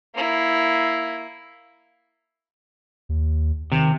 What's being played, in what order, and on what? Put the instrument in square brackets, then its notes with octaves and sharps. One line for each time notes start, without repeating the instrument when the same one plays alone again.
[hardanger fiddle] A#3 E4
[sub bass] D#2
[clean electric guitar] C3 [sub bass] D#3